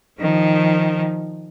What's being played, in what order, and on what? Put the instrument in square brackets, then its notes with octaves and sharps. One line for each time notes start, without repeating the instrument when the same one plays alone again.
[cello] D#3 F3